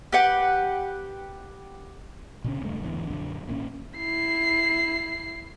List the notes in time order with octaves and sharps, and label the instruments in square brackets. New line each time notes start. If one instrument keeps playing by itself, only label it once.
[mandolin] G4 B4 F#5
[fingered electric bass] A#2 C#3 C#4
D#1 C#2 G2 A3
G#1 E2 D3 E3
A#1 F#2 D3 D4
G#1 A#2 C#3 C#4
[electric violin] E4 C7